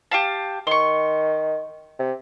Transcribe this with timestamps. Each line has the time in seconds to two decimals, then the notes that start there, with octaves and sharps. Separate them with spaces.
0.11 G4 F5 A5
0.67 D#3 C6 C#6
1.99 C3